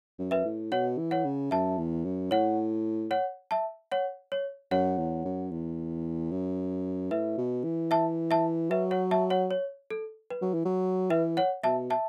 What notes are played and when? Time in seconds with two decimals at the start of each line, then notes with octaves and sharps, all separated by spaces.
0.19 F#2
0.31 B4 E5
0.45 A2
0.72 B2 C#5 F#5
0.98 E3
1.11 C#5 F#5
1.25 C#3
1.51 F#2 E5 A5
1.78 E2
2.04 F#2
2.31 A2 C#5 F#5
3.11 C#5 F#5
3.51 E5 A5
3.91 C#5 F#5
4.32 C#5
4.71 F#2 C#5 F#5
4.98 E2
5.25 F#2
5.51 E2
6.31 F#2
7.11 A2 B4 E5
7.38 B2
7.64 E3
7.91 E5 A5
8.31 E5 A5
8.70 F#3 B4 E5
8.91 C#5 F#5
9.11 E5 A5
9.30 C#5 F#5
9.51 C#5
9.90 A4
10.30 B4
10.42 F#3
10.54 E3
10.65 F#3
11.10 E3 B4 E5
11.37 C#5 F#5
11.64 B2 E5 A5
11.90 E5 A5